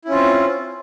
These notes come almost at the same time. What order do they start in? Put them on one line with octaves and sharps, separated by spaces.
E4 C#4 F4 C4